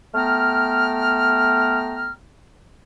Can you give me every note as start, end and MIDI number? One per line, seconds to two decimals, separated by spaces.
0.14 2.12 57
0.14 2.12 59
0.14 2.12 79
0.14 2.12 82
0.14 2.12 89